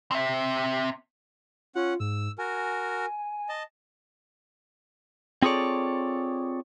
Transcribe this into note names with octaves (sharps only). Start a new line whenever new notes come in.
C4 E5
C#4 F4 F#5
G#2 E6
F#4 A#4 G#5
D#5 A5
C4 F4 G#4 A4 C#5 D5